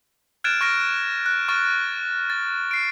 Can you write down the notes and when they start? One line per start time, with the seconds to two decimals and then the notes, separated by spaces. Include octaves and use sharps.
0.44 F6 F#6 G#6 A6 D7 E7
0.61 C#6 F6 A#6 D7
1.26 F#6
1.48 C#6 F6 A6
2.30 A6
2.71 C7 D7